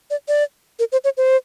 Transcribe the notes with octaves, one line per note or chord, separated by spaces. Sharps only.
D5
D5
A#4
C5
C#5
C5